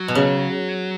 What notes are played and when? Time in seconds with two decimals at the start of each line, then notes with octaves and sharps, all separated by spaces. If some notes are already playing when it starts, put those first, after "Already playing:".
Already playing: F#3
0.08 B2
0.15 C#3